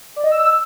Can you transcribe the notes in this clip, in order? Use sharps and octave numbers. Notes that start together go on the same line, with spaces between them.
D5
D#5
E6